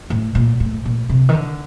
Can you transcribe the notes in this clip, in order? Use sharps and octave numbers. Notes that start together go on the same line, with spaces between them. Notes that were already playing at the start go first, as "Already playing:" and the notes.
A2
A#2
A2
A#2
C3
D#3
D3